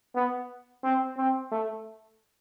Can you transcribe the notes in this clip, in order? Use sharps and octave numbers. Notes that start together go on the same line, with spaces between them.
B3
C4
C4
A3